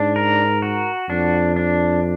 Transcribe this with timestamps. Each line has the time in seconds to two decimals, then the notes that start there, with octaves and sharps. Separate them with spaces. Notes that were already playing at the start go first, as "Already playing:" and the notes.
Already playing: G#2 D4
0.16 A#4
0.62 F#4
1.09 F2 D4
1.56 D4